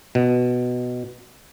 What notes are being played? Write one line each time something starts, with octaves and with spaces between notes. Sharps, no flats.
B2